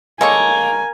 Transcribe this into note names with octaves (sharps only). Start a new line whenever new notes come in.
G#3 A#3 A4 C#5 G#5